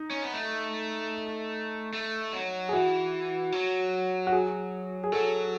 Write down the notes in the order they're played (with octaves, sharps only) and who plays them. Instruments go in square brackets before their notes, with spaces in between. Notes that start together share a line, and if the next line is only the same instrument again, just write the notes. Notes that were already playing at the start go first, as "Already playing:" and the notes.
Already playing: [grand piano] D#4
[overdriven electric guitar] C#4
B3
A3
A3
F#3
[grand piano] G#4
[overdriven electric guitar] E3 [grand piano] F#4
[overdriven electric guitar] F#3
[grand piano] F#4
G#4
G#4
[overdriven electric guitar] F#3 [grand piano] A4